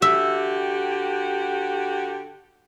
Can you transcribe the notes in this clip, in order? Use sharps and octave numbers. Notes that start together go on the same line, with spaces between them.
D3 F#4 G4 E5